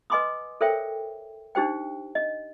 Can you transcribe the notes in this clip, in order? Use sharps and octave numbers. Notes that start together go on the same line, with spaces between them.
B4 D#5 G#5 C6 D6 D#6
A4 A#4 C5 C#5 E5 G5
D4 D#4 G4 C5 G5
D#5